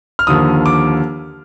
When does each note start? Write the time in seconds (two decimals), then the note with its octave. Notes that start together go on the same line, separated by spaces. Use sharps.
0.19 F6
0.27 D#2 D3 F3 D#6
0.66 D6